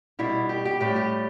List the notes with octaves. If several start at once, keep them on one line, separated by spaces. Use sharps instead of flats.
B2 G3 E4
G4
G4
A2 G3 G4
G4